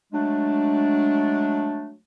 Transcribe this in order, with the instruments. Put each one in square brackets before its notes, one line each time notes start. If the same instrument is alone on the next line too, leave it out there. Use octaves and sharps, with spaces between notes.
[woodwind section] F#3 G#3 A3 D4